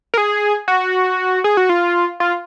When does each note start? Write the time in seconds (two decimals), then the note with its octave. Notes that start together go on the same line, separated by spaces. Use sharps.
0.14 A#4
0.18 G#4
0.68 F#4
1.44 G#4
1.57 F#4
1.69 F4
2.20 F4